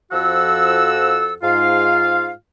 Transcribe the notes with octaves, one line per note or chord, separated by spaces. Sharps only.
F2 F3 F#4 A4 F#5 E6
G#2 F4 F5